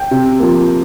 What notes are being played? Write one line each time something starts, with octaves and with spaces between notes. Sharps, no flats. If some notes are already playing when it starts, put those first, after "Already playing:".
Already playing: G5
C3
F3 A#3